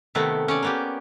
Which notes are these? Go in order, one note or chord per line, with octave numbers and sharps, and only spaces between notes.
C3 D#3 A3 B3
C#4 C#5 D5
A#3 B3 G4